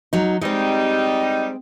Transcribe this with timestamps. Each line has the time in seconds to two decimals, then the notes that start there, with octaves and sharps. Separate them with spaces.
0.13 F#3 D#4
0.41 G3 G#3 C4 D#4